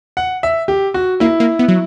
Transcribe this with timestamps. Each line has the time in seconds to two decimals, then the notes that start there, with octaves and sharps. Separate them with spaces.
0.17 F#5
0.43 E5
0.68 G4
0.94 F#4
1.20 A#3 E4
1.40 A#3
1.59 B3
1.68 F#3